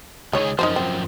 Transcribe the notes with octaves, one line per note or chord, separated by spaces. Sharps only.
C#2 D#3 G#4 C#5
F#2 F3 D#4 A#4 C5
C4